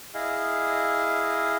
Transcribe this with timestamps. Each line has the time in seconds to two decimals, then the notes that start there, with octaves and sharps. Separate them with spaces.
0.14 E4 G#4 D#5 F5